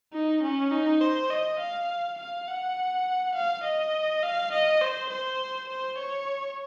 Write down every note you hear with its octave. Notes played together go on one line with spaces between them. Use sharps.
D#4
C#4
D#4
C5
D#5
F5
F5
F#5
F5
D#5
F5
D#5
C5
C5
C5
C#5